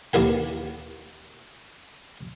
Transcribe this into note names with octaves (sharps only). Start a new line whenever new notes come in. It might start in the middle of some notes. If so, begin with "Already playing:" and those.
D#2 E4 A#4 G#5